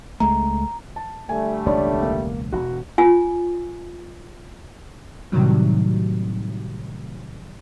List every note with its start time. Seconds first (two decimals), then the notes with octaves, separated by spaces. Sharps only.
0.20 C#2 G#3 A3 A#5
0.96 A5
1.29 D3 G3 A3 G#5
1.66 E1 C#2 D4 C#5 D5
2.02 A#3
2.52 E1 F#4
2.98 F4 G#5
5.32 A2 C3 D#3 F#3 G3